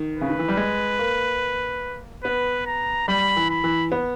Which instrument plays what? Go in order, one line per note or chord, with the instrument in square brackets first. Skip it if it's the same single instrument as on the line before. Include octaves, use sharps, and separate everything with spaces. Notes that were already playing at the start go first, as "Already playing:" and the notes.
Already playing: [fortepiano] D#3
[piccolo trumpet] B4
[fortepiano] C#3
D#3
E3
G3
G#3
A#3
[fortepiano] B3 [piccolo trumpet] B4
[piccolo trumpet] A#5
[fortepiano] G3 [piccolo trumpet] B5
[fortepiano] E3
[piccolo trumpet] B5
[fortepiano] E3
B3